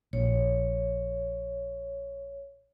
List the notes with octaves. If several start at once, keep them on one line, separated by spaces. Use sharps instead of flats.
A#1 C#5